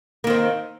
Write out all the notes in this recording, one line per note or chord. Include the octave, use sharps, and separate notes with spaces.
D#3 A#3 C4